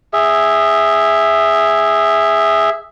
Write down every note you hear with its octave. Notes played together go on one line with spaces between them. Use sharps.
G#4 E5